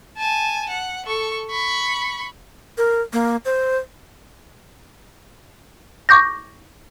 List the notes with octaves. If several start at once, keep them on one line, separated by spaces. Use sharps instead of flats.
G#5 A5
F#5
A4 C#6
B5 C#6
A#4
A#3
C5
C#6 D6 G6 A#6